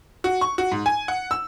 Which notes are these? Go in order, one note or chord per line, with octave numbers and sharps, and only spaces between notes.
F#4
C#6
F#4
G#2
G#5
F#5
E6